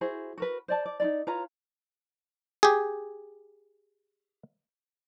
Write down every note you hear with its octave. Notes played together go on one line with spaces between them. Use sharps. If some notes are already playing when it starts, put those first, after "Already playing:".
E4 F#4 G#4 C5
F#4 A#4 B4
C5 D5 A5
D5
D#4 F4 D5
F4 B4 C#5 A#5
G4 G#4